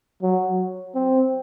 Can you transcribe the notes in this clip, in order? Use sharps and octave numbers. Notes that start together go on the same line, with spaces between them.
F#3
C4